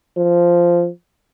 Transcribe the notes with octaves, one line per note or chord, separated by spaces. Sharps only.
F3